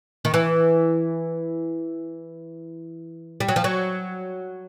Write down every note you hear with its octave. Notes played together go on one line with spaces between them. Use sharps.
D#3
E3
G3
F#3
F3
F#3